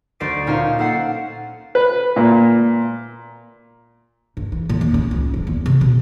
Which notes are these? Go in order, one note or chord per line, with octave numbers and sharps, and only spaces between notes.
D2 C5 D5 C7 D7
A#2 C#4 D#4 C5 F5
A#3 A4 F#5 C7
B4
A#2
G2
E3
A2
D#2
C#4
C#2
D1
E2
C3
B2